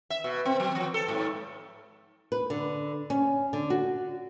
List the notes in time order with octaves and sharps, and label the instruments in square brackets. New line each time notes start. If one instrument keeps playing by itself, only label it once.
[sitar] E5
B2
C4
F#3
F3
A4
G#2
[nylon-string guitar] B4
D3
C#4
D3
F#4